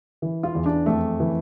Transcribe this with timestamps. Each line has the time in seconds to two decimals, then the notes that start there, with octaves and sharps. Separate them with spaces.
0.22 E3
0.43 F4
0.55 E2
0.66 D4
0.86 F2 A3
1.20 E3